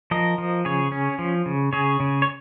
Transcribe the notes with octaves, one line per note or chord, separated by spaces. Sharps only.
F3 A#4 D#5
F3
C#3 G#4 C#5
C#4
F3
C#3
C#3 G#4 C#5
C#3
C#5